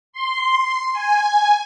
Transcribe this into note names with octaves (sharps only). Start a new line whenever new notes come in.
C6
G#5